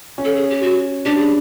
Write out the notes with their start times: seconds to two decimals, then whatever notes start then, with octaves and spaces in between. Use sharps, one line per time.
0.18 C#4
0.25 A4
0.36 G#4
0.50 G4
0.62 F#4
1.05 D4 G4
1.18 G#4